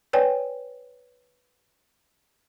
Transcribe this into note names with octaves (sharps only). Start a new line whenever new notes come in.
B4 C#5 D5 G5 G#5